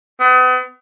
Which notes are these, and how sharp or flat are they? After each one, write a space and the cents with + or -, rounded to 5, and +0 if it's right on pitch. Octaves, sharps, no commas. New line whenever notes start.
B3 +40